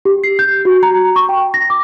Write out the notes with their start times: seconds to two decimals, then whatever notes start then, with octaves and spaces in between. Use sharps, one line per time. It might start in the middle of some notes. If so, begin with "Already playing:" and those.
0.05 G4
0.24 C7
0.39 G6
0.65 F#4
0.83 A#5
1.16 C#6
1.29 G5
1.54 A#6
1.70 D6